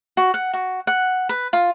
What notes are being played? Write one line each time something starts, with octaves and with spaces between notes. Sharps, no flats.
F#4
F#5
F#4
F#5
B4
F4